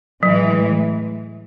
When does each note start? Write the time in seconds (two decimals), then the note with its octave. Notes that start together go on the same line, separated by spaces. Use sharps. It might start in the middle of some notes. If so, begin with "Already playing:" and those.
0.23 A2 E3 F#3 G#3